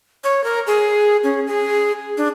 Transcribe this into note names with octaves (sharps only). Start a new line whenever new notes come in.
C#5
A#4
G#4
C#4
G#4
D4